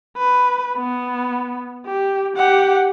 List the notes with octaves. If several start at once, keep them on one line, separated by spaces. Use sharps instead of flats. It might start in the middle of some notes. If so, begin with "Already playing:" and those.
B4
B3
G4
G4 F#5